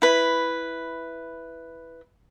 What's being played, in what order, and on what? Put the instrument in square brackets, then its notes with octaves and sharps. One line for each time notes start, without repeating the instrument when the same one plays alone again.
[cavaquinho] E4 B4